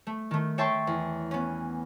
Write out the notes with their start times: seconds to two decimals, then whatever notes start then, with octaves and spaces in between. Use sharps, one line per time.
0.07 A3
0.31 D#3 A3
0.58 C#5 E5 G5 A5 C6 C#6
0.87 E2
1.31 B3 C#4